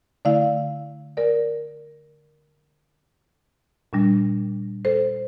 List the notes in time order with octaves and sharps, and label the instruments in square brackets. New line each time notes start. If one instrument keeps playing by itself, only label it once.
[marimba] D3 A3 E4 D5 F5
A#4 D5
A#2 G3 D4
A4 C5